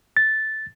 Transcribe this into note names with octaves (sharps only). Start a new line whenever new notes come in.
A6